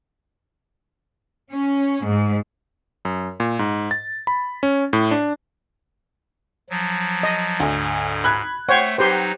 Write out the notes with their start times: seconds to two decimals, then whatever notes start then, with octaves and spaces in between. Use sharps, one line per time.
1.50 C#4
2.04 G#2
3.05 F#2
3.40 A#2
3.59 G#2
3.91 A6
4.27 B5
4.63 C#4
4.93 A2
5.11 D4
6.70 F3 F#3
7.23 D#5
7.60 D2 G#2
8.24 B5 F#6 G#6
8.69 A3 C5 C#5 F#5 G5
8.98 F#3 D#4 G4 B4 C5